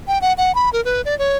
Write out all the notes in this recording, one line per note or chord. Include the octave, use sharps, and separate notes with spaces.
G5
F#5
F#5
B5
A#4
B4
D5
C#5